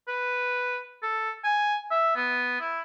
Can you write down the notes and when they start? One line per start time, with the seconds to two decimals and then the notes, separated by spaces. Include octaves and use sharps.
0.08 B4
1.03 A4
1.44 G#5
1.91 E5
2.16 B3
2.61 E4